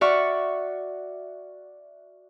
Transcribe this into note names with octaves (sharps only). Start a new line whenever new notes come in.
F#4 D5 E5 F#5 C#6 F6